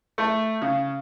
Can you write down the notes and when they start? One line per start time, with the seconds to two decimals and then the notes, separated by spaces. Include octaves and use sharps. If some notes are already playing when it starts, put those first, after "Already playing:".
0.18 A3
0.62 C#3